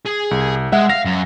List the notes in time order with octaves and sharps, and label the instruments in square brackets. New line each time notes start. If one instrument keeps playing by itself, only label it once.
[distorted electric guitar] G#4
[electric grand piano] C2
[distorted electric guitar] G#3 [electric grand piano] E5 F#5
[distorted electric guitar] F5 [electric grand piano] A#6
[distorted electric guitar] F#2